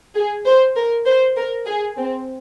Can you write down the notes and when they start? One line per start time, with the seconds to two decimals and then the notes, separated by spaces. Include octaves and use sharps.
0.15 G#4
0.46 C5
0.76 A#4
1.06 C5
1.37 A#4
1.66 G#4
1.97 C4